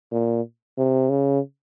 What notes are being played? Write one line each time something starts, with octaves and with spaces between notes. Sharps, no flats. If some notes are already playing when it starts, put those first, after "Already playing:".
A#2
C3
C#3